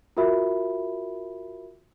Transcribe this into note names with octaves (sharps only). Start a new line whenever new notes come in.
F4 F#4 A#4 E5 B5